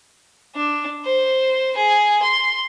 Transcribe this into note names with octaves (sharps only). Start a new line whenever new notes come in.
D4
C5
G#4
C6